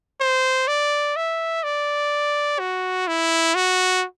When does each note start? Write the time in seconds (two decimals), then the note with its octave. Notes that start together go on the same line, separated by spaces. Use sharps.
0.21 C5
0.67 D5
1.16 E5
1.64 D5
2.59 F#4
3.07 E4
3.55 F#4